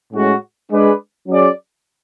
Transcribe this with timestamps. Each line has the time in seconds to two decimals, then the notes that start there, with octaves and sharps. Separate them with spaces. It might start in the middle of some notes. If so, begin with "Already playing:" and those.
0.13 A2 G#3 C#4 F#4
0.71 G#3 D4 G#4 B4 D5
1.27 F#3 C#4 G#4 D5